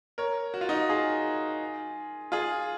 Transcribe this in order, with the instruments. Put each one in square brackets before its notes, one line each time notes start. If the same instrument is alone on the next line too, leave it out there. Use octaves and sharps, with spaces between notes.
[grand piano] A#4 C#5
F#4
F4
D#4 F#4
F4 G#4
F4 G#4